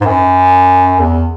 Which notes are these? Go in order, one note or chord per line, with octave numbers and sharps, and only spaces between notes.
G#2
F#2
E2